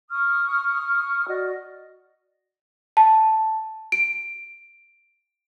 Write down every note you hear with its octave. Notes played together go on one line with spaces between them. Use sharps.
C#6 D#6 F6
F#4 D5 D#5
A5
D7